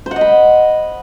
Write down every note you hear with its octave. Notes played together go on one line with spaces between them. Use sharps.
C5
F#5
D#5
B5